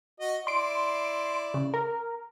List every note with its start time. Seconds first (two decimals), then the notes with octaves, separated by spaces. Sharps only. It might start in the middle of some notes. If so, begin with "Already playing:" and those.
0.20 F#4 D#5
0.47 E4 D5 C6 D7
1.54 C#3
1.74 A#4